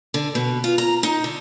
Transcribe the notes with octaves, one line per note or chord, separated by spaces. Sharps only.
D3
B2
F4
A#5
D#4
D3